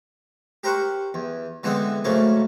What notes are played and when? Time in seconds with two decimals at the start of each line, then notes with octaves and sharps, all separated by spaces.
0.63 G4 A#4 C5 F#5 C#6
1.14 E2
1.63 D3 E3 G#3 B3 C4
2.04 G#2 C#3 F#3 A3 A#3